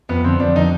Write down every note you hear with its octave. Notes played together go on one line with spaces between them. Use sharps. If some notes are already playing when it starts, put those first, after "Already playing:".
F2 B3
D3 F3 C4
F2 D4
D3 F3 D#4